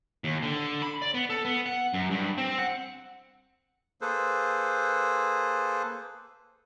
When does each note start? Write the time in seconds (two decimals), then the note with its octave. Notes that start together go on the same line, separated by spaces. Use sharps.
0.24 D#2
0.43 D3
0.82 B5
1.02 D5
1.14 B3
1.30 A4
1.45 B3
1.66 F#5
1.94 F#2
2.11 G2
2.38 C4
2.59 F#5
4.01 A#3 G#4 A4 B4 C5